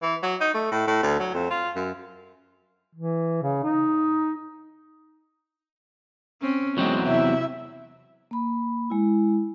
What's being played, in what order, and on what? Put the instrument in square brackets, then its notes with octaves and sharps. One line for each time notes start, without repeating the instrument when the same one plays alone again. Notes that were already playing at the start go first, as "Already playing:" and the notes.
[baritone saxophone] E3
F#3
D#4
A3
A2
A2
D2
F#3
F2
F4
F#2
[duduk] E3
C#3
D#4
[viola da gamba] C4 C#4
[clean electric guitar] E2 F#3 C4 [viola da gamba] G#3
[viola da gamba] C3 [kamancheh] E4 E5
[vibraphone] A#3 B5
G#3 E4